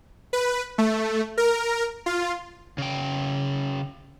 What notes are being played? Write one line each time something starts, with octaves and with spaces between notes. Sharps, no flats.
B4
A3
A#4
F4
C#3 G5